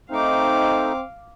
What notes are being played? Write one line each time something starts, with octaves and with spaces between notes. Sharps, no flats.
A3 C4 D#4 F5 D6